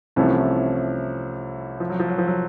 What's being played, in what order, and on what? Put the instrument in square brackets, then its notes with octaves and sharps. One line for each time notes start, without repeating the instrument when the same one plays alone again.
[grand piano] C2 C3 F3 A3 C#4 [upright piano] E3
[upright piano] F3
F#3
F3
F#3
F3
F#3